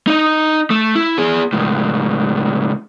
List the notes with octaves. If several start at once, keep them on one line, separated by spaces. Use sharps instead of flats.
D#4 D#5
A3
E4
B3 G#4
C#2 A2